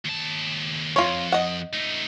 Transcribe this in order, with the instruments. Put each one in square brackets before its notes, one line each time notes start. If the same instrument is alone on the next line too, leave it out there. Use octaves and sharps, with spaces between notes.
[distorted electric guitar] D#2 A5
[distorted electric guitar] F2 [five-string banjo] F4 C#5
[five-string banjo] D#5 F#5
[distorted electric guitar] A3 D#4